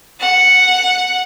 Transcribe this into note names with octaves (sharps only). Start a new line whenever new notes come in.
F#5